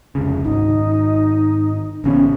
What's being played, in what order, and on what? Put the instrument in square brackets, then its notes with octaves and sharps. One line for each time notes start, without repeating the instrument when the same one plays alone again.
[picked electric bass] F1 C#2 C#3
[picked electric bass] G#1 [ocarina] D#4
[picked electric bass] A1 C#3 B3 [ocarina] C#4